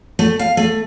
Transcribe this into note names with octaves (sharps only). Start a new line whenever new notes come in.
A3
F5
A3